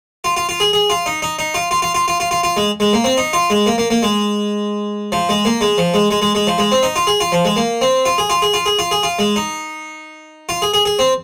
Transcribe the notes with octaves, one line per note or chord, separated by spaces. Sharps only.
F4
F4
F4
G#4
G#4
F4
D#4
D#4
D#4
F4
F4
F4
F4
F4
F4
F4
F4
G#3
G#3
A#3
C4
D#4
F4
G#3
A#3
A#3
A#3
G#3
F3
G#3
A#3
G#3
F3
G#3
G#3
G#3
G#3
F3
G#3
C4
D#4
F4
G#4
F4
F3
G#3
A#3
C4
F4
G#4
F4
G#4
F4
G#4
F4
G#4
F4
G#3
D#4
F4
G#4
G#4
G#4
C4